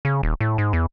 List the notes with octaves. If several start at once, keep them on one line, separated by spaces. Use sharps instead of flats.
C#3
D#1
A2
G#2
E2